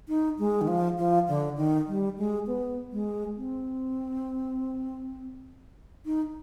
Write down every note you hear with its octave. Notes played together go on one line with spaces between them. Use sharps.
D#4
G#3
D#3
F3
F3
D3
D#3
G3
G#3
B3
G#3
C4
D#4